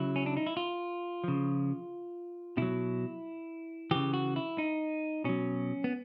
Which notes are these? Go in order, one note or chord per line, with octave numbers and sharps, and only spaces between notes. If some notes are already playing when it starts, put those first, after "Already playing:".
Already playing: C#3 F#3 E4
C#4
D4
D#4
E4
F4
C#3 F3
B2 F#3 E4
C#3 E3 G4
F#4
E4
D#4
B2 F#3 C#4
B3